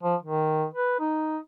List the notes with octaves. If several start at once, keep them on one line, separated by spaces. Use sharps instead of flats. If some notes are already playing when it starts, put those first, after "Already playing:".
F3
D#3
B4
D#4